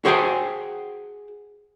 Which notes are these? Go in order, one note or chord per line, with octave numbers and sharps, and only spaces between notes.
F#4 G#4 C5 F5 G5 G#5